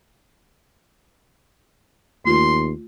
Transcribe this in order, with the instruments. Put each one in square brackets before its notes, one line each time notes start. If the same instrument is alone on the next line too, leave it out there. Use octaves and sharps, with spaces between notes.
[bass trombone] D#2 [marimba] A3 F4 [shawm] C6